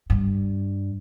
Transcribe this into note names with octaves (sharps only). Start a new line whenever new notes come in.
G2